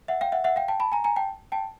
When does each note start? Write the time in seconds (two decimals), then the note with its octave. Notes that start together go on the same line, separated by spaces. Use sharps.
0.08 E5 F#5
0.21 F5 G5
0.32 E5 F#5
0.44 E5 F#5
0.56 F5 G5
0.68 G5 A5
0.80 A5 B5
0.92 G#5 A#5
1.04 G#5 A#5
1.16 G5 A5
1.52 G5 A5